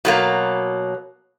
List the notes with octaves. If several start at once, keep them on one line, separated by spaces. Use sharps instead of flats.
B2 F#3 A#3